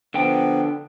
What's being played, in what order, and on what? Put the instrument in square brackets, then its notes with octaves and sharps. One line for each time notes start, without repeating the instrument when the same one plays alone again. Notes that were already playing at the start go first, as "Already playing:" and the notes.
[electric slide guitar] D3 G5 [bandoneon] F3 B3